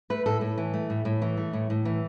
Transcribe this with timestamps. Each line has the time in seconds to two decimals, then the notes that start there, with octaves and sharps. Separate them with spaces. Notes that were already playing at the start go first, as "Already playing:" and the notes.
0.10 A3 B4
0.26 A2 A4
0.41 A2
0.58 E3
0.74 A3
0.90 A2
1.05 A2
1.22 E3
1.37 A3
1.53 A2
1.70 A2
1.85 E3